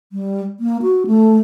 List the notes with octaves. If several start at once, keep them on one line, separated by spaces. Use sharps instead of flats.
G3
A#3
F#4
A3